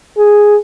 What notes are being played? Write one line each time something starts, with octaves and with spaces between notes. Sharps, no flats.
G#4